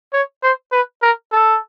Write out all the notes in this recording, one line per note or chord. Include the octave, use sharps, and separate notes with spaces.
C#5
C5
B4
A#4
A4